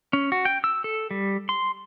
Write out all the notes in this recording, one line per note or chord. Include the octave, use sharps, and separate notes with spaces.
C#4
F#4
G5
E6
A4
G3
C6